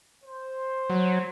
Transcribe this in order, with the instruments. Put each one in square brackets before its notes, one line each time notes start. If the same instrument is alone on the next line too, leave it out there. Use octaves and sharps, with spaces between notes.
[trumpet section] C5
[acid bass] F#3